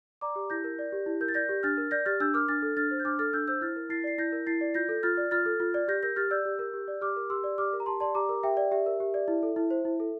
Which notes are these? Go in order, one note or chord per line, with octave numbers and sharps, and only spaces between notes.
D5 A#5 D6
G4
E4 G6 A#6
A#4
D5
G4
E4
A#4 G6
A6
D5 G6 A#6
G4
D4 F6 A6
A#4
D5 G6 A#6
G4 F6 A6
D4 E6 G6
A#4 D6 F6
D4 F6 A6
A4
D4 F6 A6
C5
G6
D4 D6 F6
A4 F6 A6
D4 E6 G6
C5 E6 G6
E4 F6 A6
A#4
E4 A6 C7
D5 C7
E4 G6 A#6
A#4
E4 A6 C7
D5
F4 G6 A#6
A4
F4 F6 A6
D5
F4 F6 A6
A4
F4
D5
G4 G6 A#6
A#4 G6 A#6
G4 F6 A6
D5 E6 G6
G4
A#4
G4
D5
G4 D6 F6
A#4
G4 C6 E6
D5
G4 D6 F6
A#4
A#5
G4 A5 C6
D5 A5 C6
G4 A#5 D6
A#4
G4 E5 G5
D5
G4 E5
A#4
G4
D5
E4
A4
E4
C5
E4
A4